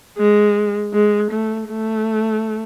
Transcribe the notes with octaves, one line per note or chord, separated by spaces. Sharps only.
G#3
G#3
A3
A3